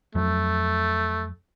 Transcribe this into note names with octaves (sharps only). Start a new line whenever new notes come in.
F2 F#3 A3